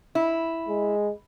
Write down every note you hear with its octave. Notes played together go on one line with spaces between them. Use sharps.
E4
G#3